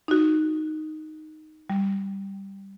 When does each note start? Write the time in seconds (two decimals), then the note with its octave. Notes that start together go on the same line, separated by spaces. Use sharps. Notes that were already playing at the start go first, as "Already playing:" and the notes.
0.08 D#4 F#4
1.70 G3